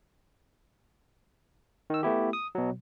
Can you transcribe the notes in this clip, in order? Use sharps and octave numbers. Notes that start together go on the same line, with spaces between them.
D#3 E6
A3 B3 E4 G4
D#6
B2 F#3